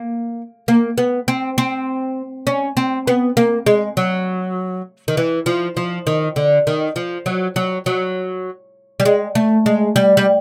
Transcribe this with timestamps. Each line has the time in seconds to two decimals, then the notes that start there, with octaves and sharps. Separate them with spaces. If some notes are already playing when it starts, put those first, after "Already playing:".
Already playing: A#3
0.68 A#3
0.98 B3
1.28 C4
1.58 C4
2.47 C#4
2.77 C4
3.07 B3
3.37 A#3
3.66 G#3
3.97 F#3
5.08 D#3
5.17 E3
5.46 F3
5.77 F3
6.07 D#3
6.36 D3
6.67 D#3
6.96 F3
7.26 F#3
7.56 F#3
7.86 F#3
9.00 G3
9.05 G#3
9.35 A3
9.66 G#3
9.96 G3
10.17 G3